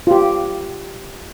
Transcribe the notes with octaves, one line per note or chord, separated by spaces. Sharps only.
F4 G4